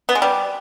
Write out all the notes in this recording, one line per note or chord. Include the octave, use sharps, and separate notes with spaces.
B3
G#3
G3